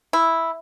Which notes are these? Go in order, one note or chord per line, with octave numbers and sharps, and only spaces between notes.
E4